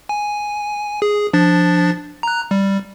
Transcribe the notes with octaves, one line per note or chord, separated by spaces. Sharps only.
G#5
G#4
F3 D4 A6
A#5 F#6
G3